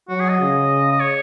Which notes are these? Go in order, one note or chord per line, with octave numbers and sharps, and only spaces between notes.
F#3 F#4
G#4
D#5
C#3
D#5
C#5